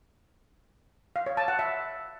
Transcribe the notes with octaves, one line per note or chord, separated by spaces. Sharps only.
F5
C#5
A5
F#5
E5